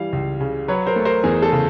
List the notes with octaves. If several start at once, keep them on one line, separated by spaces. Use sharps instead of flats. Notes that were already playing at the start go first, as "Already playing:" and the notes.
Already playing: E3 G3 F5
C#2
C#3
F#3 B4 C#5
A#4 C5
A3
A#4 C5
E2 G#4 A#4
A4
C#3